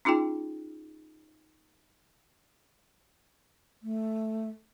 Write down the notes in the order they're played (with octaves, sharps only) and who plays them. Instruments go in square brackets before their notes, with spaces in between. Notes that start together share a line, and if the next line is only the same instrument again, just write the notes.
[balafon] C#4 D#4 F4 G#4 G5
[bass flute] A3